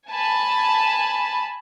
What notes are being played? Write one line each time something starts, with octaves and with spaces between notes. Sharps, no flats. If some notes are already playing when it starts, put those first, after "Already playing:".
G#5 A5 B5